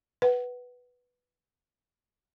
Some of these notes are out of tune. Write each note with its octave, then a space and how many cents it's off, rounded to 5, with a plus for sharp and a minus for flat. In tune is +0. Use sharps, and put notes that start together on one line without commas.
B4 +0 F#5 +20